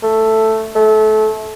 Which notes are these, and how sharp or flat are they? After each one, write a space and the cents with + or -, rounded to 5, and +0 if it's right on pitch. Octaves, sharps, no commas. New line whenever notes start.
A3 +5
A3 -25